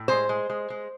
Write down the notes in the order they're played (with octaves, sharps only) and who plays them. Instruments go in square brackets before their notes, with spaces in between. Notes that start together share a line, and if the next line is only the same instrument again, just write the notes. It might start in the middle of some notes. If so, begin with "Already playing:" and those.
Already playing: [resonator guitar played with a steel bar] A2
G#3 C5
G#3
G#3
G#3